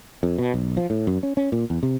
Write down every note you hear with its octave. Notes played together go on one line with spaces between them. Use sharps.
F2
B2
B1
F3
A2
F#2
C#4
C#4
A#2
E2
C3